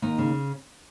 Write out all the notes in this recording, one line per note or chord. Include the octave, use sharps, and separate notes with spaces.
D#2 D#4
C#3